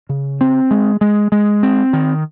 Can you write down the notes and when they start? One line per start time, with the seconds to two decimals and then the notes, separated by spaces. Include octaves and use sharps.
0.09 C#3
0.41 C4
0.71 G#3
1.01 G#3
1.32 G#3
1.63 C4
1.93 D#3